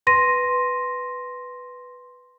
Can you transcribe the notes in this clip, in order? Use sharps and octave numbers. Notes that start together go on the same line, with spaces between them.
B4 C6 A#6 D#7